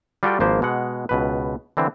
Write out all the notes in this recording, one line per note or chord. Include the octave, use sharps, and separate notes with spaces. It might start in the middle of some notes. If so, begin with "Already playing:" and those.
G3 F4 F#4 A4 D5 G5
G#1 F3 A#3 B4 C5
B2 G#3 F#5
C#2 B2 B4
D3 E3 C4